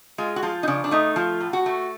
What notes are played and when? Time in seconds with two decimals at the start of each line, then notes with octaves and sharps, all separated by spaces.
0.18 G#3 F4
0.36 F#4
0.43 F3 F4
0.63 D#4
0.68 C#3 D4
0.84 D4
0.91 A3 D#4
1.16 F3 F4
1.41 A2
1.53 F#4
1.66 A3